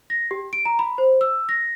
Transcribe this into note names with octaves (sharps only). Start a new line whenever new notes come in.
A#6
G4
D7
A#5
B5
C5
E6
A#6